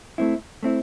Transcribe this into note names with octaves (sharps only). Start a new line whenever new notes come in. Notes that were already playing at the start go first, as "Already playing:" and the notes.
A3 C4 E4
A3 C4 E4